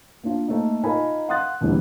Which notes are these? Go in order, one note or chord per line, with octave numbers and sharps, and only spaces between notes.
A#3 D4 F4
A3 A#3 D#4
D#4 F4 A4 A#4 G#5 B5
F5 F#5 C6 D#6 F#6 A6
D#2 B2 D3 E3 G3 A#3